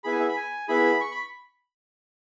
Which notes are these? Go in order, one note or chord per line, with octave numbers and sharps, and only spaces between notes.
B3 E4 G#4 B5
G#5
E5
B5
G#5
B3 E4 G#4 B5
C#6
B5